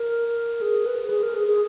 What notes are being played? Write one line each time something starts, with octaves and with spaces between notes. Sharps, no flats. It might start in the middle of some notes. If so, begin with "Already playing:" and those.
Already playing: A#4
G#4
B4
G#4
A#4
G#4
G#4